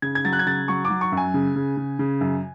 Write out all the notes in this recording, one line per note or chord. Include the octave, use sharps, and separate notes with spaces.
C#3 G#6
G#6
F#3 A6
F#6
G#6
C#3 A6
F#3 C#6
D6
F#3
C#6
F#2
G#5
C#3
C#3
C#3
C#3
F#2